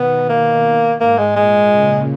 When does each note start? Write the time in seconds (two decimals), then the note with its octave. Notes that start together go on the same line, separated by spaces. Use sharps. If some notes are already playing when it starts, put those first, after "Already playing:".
Already playing: B2 D#3 B3
0.29 A#3
1.00 G#2 A#3
1.18 G#3
1.36 A#2 G#3
1.71 C#3